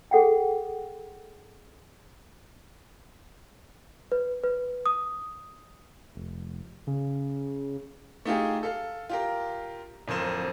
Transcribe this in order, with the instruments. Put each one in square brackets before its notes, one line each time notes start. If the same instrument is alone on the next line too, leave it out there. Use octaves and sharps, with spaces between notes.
[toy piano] G#4 A4 F#5 G5
[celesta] B4
B4
D#6
[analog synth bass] F1
C#3
[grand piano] A3 D#4 F4 G4 G#4
A4 F5
F4 G4 A#4
D1 F2 A#4 C5 E7